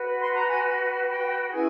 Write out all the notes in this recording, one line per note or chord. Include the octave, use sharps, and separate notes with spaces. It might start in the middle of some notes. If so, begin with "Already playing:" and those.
Already playing: F#4 B4
C6
A#5
G#5
G5
C#4 E4 G#4 B4 G#5